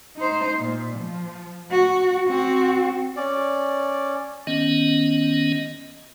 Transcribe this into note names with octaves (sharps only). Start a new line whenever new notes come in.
D#4 C5
A#2
F3
F#4
C4 F#4
C#4 D5
D#3 B3 C#4 D#5